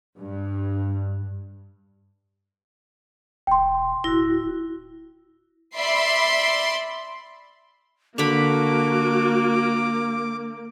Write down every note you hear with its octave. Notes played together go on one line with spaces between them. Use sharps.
G2
E1 G5 C6
D1 E4 F#4 A#6
D5 E5 B5 C6 C7
D3 A#3 F#4 B5 D6